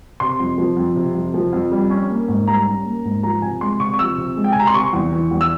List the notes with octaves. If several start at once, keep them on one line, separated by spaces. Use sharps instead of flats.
C3 C6
F2
F3
F2
C3
F2
F3
F2
G3
C#4
A#3
G#2
G3 A#5
C#4
A#3
G#2
F3 A#5
C3 G#5
G#3 C6
C3 C#6
C#6
F3 E6
C3
G#3
G5
G#5
C3 A#5
C6
C3 C#6
E2
E3
E2
E6